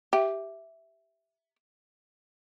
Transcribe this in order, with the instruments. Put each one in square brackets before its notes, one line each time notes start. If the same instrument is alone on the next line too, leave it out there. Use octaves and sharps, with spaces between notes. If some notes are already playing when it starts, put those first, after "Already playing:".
[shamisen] G4 [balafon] E5